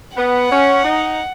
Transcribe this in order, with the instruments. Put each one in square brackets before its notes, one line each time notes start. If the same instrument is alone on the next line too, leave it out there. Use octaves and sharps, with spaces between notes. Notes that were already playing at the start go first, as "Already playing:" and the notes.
[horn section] B3 [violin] F#5
[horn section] C#4
D#4